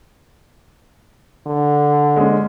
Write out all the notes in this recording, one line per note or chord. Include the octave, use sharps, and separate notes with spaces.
D3
G#3 C#4